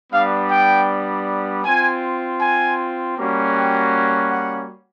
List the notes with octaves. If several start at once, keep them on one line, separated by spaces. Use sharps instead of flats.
G3 B3 D4 F5
G5
C4 F4 G#5
G#5
G3 A#3 C#4 F#4
G5
F#5